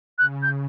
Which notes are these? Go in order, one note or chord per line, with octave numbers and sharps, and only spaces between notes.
C#3 F#6
G6